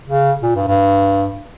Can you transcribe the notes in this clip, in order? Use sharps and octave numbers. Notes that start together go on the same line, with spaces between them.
C#3
A#2
G2
G2